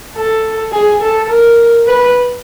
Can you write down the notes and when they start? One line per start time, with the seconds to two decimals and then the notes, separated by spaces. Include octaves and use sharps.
0.15 A4
0.72 G#4
1.01 A4
1.29 A#4
1.87 B4